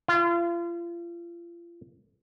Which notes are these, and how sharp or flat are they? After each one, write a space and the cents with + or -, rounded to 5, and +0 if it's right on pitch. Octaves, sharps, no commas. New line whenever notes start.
F4 -35